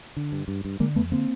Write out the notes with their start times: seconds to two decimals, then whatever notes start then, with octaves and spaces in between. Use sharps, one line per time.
0.17 D3
0.32 G2
0.48 G2
0.65 G2
0.80 D3 G#3 A#3
0.95 F2 A3 B3
1.12 D3 A#3 C4